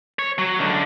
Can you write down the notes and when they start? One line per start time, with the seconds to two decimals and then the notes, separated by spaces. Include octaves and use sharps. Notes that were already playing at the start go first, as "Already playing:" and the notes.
0.19 C#5
0.38 F#3
0.59 C#2 D3